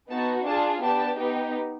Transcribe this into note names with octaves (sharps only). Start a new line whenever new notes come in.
B3 D#4 F#4 A5
D4 F4 G#4 A5
B3 D4 G4 A5
B3 D#4 G4